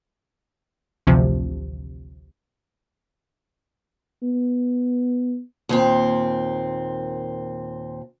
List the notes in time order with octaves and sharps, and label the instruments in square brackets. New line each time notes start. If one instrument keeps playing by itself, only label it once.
[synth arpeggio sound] A1 D2 C3 F3
[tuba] B3
[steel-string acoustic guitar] D#2 A#2 C4